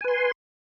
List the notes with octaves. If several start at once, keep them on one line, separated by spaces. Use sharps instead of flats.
B4 G#5 C6